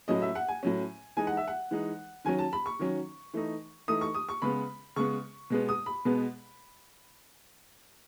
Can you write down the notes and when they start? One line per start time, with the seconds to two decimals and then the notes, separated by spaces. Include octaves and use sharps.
0.08 A2 F#3 C#4 D#5
0.22 E5
0.35 F#5
0.48 G#5
0.63 A2 F#3 C#4
1.17 E3 G#3 D#4 G#5
1.27 F#5
1.37 E5
1.48 F#5
1.71 E3 G#3 D#4
2.25 D#3 F#3 C#4 G#5
2.39 A5
2.53 B5
2.66 C#6
2.79 D#3 F#3 C#4
3.34 E3 A3 D#4
3.88 E3 A3 D#4 D#6
4.01 C#6
4.15 D#6
4.29 C#6
4.42 C#3 G#3 B3 B5
4.96 C#3 G#3 B3 C#6
5.50 B2 G#3 B3
5.69 D#6
5.86 B5
6.05 B2 G#3 B3